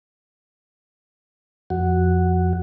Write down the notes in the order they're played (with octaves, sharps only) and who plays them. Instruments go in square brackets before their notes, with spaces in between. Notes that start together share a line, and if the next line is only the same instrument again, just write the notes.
[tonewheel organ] F2 F#4